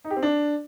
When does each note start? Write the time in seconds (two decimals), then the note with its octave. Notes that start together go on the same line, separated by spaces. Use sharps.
0.05 D#4
0.11 G4
0.17 C4
0.23 D4